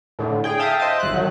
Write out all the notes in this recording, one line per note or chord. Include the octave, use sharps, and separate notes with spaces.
A2 D3
G#4 G5
E5 F5 G5 A5 D#6
C5 D#5 E5 A5
G#1 F#6
D#3 F#3